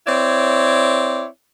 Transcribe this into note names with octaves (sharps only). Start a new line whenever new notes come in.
C4 E4 C#5 D5